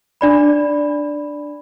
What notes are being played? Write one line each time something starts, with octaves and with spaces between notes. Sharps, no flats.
D4 D5 B5